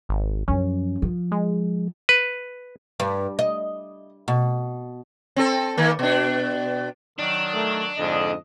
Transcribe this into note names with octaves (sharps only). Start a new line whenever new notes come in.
G#1
F#2 F3 C#4
F3
G#3
B4
G2
D#5
B2
C4 A4
D#3 A#3
B2 D4
D#3 F#3 D4
A3 A#4
F2 G#2 D3 D#5